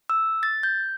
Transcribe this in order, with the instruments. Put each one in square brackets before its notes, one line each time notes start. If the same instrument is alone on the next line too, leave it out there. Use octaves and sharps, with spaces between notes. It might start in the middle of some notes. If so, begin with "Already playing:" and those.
[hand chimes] E6
A6
G6